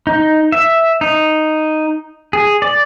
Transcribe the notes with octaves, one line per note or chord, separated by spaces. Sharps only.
D#4
E5
D#4
G#4
D5